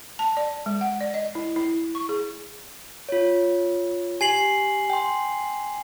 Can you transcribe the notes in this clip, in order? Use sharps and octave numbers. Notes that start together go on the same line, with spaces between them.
A5
D5
G#3
F#5
D5
D#5
E4
E4
C#6
G#4
F4 C#5
G4 G#5 C7 F#7
G5 C6